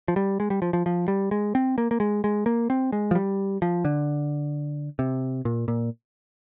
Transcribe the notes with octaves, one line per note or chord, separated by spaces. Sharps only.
F3
G3
G#3
G3
F3
F3
F3
G3
G#3
C4
A#3
A#3
G#3
G#3
A#3
C4
G#3
F3
G3
F3
D3
C3
A#2
A#2